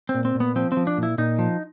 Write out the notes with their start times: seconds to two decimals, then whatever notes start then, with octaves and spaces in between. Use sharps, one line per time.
0.09 C4
0.14 A#2
0.25 C4
0.35 A#2
0.40 B3
0.56 F3 C4
0.72 C4
0.77 F3
0.87 D4
0.98 A#2
1.03 E4
1.18 A#2 D#4
1.39 F3